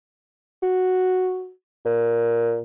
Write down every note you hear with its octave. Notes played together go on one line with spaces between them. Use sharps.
F#4
A#2